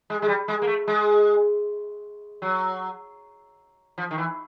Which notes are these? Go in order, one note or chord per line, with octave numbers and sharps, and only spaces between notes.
G#3
G#3
G3
G#3
A#3
A3
G#3
F#3
F3
D#3
E3